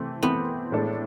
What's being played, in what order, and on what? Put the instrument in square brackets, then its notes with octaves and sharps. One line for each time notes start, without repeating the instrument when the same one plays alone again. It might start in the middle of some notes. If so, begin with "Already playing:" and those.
Already playing: [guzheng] C3 [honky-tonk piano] E3 A3 C4
[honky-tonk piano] E3 A3 C4 [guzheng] B3
[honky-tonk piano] A2 G#3 D4 A4